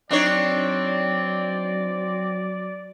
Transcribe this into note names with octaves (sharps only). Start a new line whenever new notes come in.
F#3 C4 D4 D#4 C#5 D5